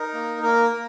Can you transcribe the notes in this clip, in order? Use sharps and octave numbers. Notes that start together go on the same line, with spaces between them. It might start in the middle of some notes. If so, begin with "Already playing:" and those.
Already playing: D#4 A#4
A#3
A#3 A#4
A#3